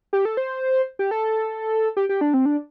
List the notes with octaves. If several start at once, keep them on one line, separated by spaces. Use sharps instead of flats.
G4
A4
C5
G4
A4
G4
G4
D4
C4
D4